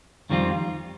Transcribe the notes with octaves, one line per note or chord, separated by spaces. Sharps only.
F2 D#3 G3 C4 F4